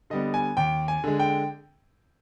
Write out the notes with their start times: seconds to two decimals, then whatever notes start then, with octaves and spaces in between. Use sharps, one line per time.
0.10 D3 G3 B3 D#5
0.34 G#5
0.57 D#2 G5
0.88 G#5
1.04 D3 G#3
1.19 G5